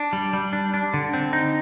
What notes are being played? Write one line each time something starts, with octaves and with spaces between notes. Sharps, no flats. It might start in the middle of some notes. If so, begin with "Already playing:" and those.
Already playing: D4
G3
G3
D4
D4
D3
C4
D#4